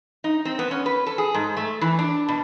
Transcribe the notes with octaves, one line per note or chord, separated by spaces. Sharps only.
D#4
C4
B3
C#4
B4
A4
G#4
G#2
A3
E3
D4
B2